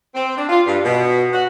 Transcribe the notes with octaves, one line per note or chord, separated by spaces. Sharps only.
C4
D4
F4
G2
B2
F#4